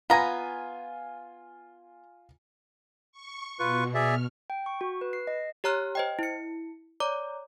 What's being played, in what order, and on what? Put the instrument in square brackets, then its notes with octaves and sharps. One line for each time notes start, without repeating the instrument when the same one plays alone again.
[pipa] B3 A#5 [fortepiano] F4 G#5
[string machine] C#6
[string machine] B2 [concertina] F4 B4 C#6
[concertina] G#4 D5 E5 [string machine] F6
[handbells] G5
C#6
F#4
B4
C7
D#5
G4 C#5 A#5 F6 F#6
C5 D#5 G5
E4 C#7
C#5 D5 A#5 D6